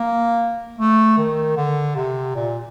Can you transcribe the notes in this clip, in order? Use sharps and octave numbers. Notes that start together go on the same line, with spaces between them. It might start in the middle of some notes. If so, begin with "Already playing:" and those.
Already playing: A#3
A3
D#3
D3
C3
A#2